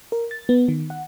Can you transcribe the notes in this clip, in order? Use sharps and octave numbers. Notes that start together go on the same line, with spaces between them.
A#4
A6
B3
D#3
F#5